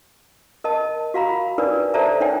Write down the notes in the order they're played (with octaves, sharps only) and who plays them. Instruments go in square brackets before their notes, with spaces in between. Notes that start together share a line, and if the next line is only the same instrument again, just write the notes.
[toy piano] A#4 D#5 A5
F#4 F5 A#5 B5
D4 D#4 A#4 B4 D5
A4 C5 D5 E5 A5 A#5
D4 D#4 C#5 G5 G#5